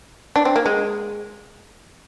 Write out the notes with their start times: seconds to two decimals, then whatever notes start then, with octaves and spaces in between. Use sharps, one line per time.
0.36 D4
0.45 C4
0.56 A#3
0.66 G#3